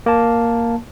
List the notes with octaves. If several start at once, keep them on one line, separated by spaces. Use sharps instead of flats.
A#3 A5